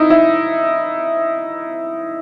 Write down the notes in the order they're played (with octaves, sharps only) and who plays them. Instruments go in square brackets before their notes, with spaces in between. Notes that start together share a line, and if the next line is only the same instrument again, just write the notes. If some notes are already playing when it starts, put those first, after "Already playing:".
Already playing: [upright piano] D#4 E4
E4